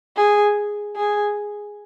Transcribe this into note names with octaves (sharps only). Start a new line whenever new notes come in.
G#4
G#4